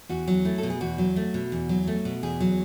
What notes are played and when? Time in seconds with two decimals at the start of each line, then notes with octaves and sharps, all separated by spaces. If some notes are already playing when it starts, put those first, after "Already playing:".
0.09 E2 F#4
0.28 F#3
0.45 A3 E4
0.58 A4
0.63 B2
0.70 G#4
0.81 E2 F#4
0.98 F#3
1.16 A3
1.34 B2
1.52 E2
1.69 F#3
1.87 A3
2.05 B2
2.23 E2 G#4
2.40 F#3